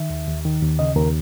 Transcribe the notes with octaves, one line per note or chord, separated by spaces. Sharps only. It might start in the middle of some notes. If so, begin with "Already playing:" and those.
Already playing: D#3 E5
D#2
D#2
D#3
D#2
C#3 D#5
D#2 A#4